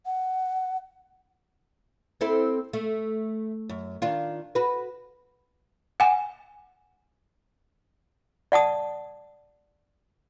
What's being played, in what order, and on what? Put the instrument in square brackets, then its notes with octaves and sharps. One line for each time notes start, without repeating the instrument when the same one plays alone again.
[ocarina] F#5
[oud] C4 E4 A4
A3
F#2
D#3 D4 F4
F#4 B4
[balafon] F#5 G#5
[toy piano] D5 F#5 A5 D#6